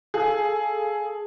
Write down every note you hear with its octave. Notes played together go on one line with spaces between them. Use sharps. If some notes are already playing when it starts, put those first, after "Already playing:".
G#4 A4 F5 G#5